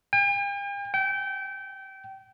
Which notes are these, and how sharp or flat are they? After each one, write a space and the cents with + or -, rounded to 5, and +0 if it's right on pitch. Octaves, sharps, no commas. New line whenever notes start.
G5 +45
G5 -25